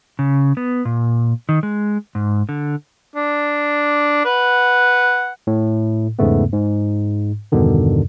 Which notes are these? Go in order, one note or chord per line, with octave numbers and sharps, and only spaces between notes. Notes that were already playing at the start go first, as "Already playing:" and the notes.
C#3
B3
A#2
D#3
G#3
G#2
D3
D4
B4 F#5
A2
E2 G#2 C#3 A3 B3
G#2
E2 G2 B2 D3 D#3